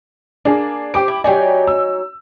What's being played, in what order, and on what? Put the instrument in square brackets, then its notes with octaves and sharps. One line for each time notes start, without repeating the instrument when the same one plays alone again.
[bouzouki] A#3 [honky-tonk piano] D4 G#4
[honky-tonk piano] G4 D6 D7 [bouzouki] C5
[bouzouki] E4
[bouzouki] F#3 D#4 G#5 [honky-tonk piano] G4 D5
[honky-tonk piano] E6